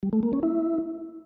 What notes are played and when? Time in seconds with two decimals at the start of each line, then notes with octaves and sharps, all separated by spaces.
0.03 G3
0.13 A3
0.23 A#3
0.33 C#4
0.43 E4